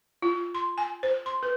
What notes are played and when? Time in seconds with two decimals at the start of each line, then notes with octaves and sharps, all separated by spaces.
0.22 F4
0.55 C6
0.78 G#5
1.03 C5
1.26 C6
1.43 B4